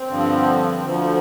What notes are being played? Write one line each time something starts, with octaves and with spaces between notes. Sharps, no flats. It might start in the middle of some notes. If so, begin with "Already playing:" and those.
Already playing: C4
G2 D3 F3
D2 D3 F3